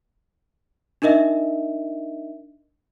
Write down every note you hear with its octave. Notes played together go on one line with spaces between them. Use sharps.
D4 D#4 A#4 D#5 E5